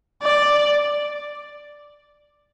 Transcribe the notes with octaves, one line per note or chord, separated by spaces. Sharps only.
D5